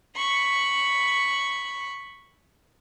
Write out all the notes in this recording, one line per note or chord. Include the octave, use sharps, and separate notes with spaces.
B5 C#6